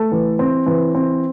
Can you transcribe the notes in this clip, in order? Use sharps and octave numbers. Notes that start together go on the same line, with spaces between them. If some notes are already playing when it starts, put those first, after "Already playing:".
Already playing: A3 A4
E3
C4
E3
C4